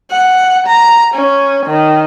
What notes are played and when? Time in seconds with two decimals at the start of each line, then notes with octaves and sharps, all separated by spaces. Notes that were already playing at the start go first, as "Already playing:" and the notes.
0.12 F#5
0.67 A#5
1.15 C#4
1.67 D#3